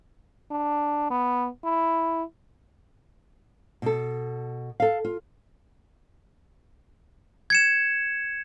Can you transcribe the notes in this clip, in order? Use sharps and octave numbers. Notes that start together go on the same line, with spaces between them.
D4
B3
E4
B2 A4
A4 F5
F4
G#6 C#7 E7